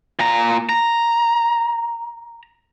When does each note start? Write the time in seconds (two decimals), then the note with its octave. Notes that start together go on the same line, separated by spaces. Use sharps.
0.19 A#2 A#5
0.69 A#5